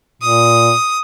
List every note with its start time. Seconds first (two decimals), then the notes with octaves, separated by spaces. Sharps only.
0.22 A#2 D#6